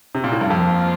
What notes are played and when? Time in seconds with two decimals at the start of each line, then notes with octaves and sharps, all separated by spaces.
0.15 C3
0.24 A#2
0.32 A2
0.41 G2
0.50 F2 F3 A#3 F4